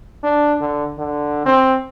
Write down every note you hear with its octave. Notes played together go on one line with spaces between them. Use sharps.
D4
D3
D3
C4